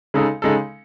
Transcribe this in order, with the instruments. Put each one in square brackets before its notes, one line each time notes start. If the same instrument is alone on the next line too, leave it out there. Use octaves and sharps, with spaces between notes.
[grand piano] C#3 G#3 D#4 A4
C#3 G#3 D#4 A4